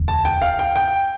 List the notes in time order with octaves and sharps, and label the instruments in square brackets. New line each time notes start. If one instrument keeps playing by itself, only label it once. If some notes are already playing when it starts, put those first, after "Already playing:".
Already playing: [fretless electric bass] E1 D2
[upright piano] A5
G5
F5
G5
G5